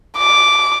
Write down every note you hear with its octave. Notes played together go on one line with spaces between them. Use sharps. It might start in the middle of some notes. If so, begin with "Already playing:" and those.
D6